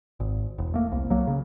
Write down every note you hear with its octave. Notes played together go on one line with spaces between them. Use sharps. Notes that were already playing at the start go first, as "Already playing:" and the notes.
G#1
E1
A3 A#3
C2
F#3 A#3
C#3